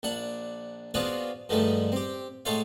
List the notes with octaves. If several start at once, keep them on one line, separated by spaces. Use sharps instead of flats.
A#1 D4 F#5
B3 C4 D4 F4 F#4 G#4
G2 D3 D#3 F3 G#3 A3
C4 G4
A2 G#3 A4 C5 C#5 F5